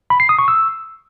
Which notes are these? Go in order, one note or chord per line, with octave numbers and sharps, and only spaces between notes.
B5
C7
D#6
C#6
E6